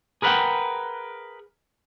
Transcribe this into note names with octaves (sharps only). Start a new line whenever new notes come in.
G#4 A#4 B4 C#5 F#5 G5